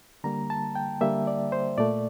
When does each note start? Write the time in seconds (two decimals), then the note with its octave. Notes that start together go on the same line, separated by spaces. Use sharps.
0.24 D3 G3 A#3 A#5
0.50 A5
0.75 G5
1.01 D3 G3 A#3 E5
1.27 D5
1.52 C5
1.78 A#2 A3 D5